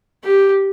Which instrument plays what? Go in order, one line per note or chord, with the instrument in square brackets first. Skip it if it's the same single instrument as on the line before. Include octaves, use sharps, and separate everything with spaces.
[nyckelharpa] G4